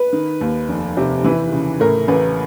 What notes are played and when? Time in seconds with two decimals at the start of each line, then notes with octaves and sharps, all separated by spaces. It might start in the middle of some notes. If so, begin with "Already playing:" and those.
Already playing: B4
0.13 D#3
0.41 D#2
0.69 F1
0.97 C3
1.24 E3 B4
1.52 C#3
1.80 A2 A#4
2.08 A1 B4